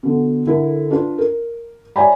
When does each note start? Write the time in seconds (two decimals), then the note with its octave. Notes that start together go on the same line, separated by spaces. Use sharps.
0.03 B2 D3
0.47 D3 E4 A4 A#4
0.91 D4 F4 B4
1.18 A#4
1.96 C#5 D5 E5 G#5 A#5 B5